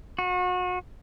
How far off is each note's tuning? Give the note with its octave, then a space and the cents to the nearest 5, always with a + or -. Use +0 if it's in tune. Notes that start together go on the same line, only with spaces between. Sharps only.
F#4 -35